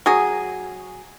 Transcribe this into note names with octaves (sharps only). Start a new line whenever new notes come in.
F#3 G#4